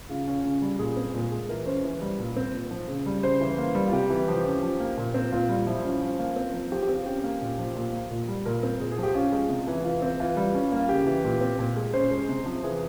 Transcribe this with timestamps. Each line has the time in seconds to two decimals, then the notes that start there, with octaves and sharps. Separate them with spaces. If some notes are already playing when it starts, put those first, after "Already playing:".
0.09 C#3 F4
0.28 C#4
0.44 C#3
0.62 G3
0.79 A#2 G#4
0.97 C4
1.14 A#2
1.32 G#3
1.49 E3 A#4
1.66 C#4 C5
1.84 E3
2.01 G3
2.19 A#2
2.37 C4
2.54 A#2
2.71 F3
2.88 C#3
3.06 G3
3.23 C#3 C5
3.41 E3
3.58 A#3
3.75 G3
3.87 F4
3.93 C3 G4
4.10 E3
4.28 F3
4.45 C#4
4.63 F3
4.80 A#3
4.97 A#2
5.14 C4
5.32 A#2 F4
5.49 G3
5.67 F3 E4
5.85 C#4 F4
6.02 F3
6.19 A#3
6.36 C4
6.54 F3
6.72 F3 G4
6.82 G4
6.89 C4
6.94 F4
7.06 C#4 G4
7.24 A#3
7.41 A#2
7.58 F3
7.75 A#2
7.93 A#3
8.11 A#2
8.29 G3
8.46 A#2 A#4
8.63 C4
8.80 A#2 G#4
8.92 G#4
8.98 F3
9.03 G4
9.15 C#4 F4
9.32 G#3
9.49 C3
9.67 E3
9.84 E3 F4
10.02 C4
10.20 E3 F4
10.37 G3
10.55 C#4
10.72 A#3
10.79 F4
10.89 C#3 G4
11.06 E3
11.24 A#2
11.41 C4
11.59 A#2
11.76 G#3
11.94 C#4 C5
12.11 G#3
12.29 C3
12.46 F3
12.63 E3 G#4